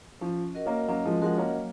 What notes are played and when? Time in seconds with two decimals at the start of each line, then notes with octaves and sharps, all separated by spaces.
0.21 F3 C#4
0.54 F#4 A#4 D#5 F#5
0.66 A#3 C#4
0.88 F#3 A#3 C#4
1.05 F3 G#3
1.22 F3 G#3 F#4 A#4 D#5 F#5
1.37 A#3 C#4
1.55 F#3